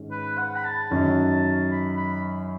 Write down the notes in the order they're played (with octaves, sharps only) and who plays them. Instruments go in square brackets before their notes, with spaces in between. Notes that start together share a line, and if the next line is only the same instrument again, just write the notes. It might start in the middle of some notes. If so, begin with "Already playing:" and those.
Already playing: [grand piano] G#2 D#3 G#3 C#4 G#4
[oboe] B4
F#5
B5
A5
[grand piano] F#2 D#3 F#3 C#4
[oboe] B5
B5